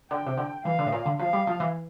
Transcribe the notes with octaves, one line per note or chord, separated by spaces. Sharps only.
D3 G5
C3
D3
E3 F5
D3
A2
A#2
D3
F3 F5
G3
F3
E3